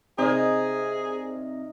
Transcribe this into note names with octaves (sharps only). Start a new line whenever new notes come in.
C3 D#4 G#4 A#4 C5 D5 D#5